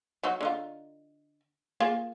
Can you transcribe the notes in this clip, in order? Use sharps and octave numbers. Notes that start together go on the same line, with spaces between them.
F#3 D#4 F#4
D3 D#4 F4
A#3 F4 G#4